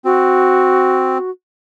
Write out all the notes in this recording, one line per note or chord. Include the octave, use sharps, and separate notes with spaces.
C4 F#4